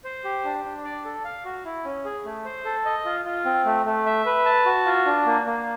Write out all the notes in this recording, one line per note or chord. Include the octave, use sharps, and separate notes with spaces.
C5
G4
D4
D4
D5
A4
F5
F#4
E4
C#4
G#4
A3
C5
A4
D#5
F4
F4
C4
A3
A3
E5
B4
A5
F#4
F4
D4
A#3
A#3